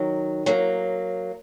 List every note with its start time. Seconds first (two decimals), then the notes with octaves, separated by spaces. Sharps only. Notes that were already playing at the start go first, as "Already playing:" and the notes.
Already playing: D#3 F#3
0.46 F#3 A#3